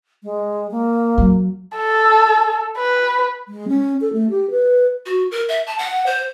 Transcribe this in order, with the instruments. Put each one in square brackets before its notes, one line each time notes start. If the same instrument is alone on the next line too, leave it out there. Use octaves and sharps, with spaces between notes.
[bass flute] G#3
A#3
[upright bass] F#3
[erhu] A4
B4
[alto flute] G#3
C#4
A4
A3
G4
B4
[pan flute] F#4
A#4
E5
A5
F#5
C5